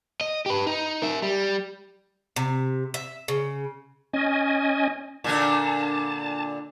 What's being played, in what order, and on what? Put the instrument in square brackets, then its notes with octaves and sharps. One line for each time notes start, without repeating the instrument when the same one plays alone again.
[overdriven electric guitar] D#5
G4 B4
D#4
A#4 E5
G3
[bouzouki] C3
E5
C#3
[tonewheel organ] C#4 D#5 G#5
[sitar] A#2 D3 D4 [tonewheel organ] A5